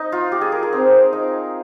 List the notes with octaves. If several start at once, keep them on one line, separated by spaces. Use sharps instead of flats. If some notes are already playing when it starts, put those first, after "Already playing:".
Already playing: D#4
F4
G4
G#4
A#4
A#4
C4
D#4